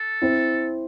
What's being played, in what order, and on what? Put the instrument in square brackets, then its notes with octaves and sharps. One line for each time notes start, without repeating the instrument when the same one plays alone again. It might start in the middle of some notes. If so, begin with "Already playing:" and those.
Already playing: [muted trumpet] A4
[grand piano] C4 E4